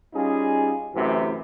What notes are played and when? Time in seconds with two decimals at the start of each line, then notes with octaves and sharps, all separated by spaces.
0.14 G3 C#4 D#4 F4 G#4
0.95 F#2 A2 C3 E3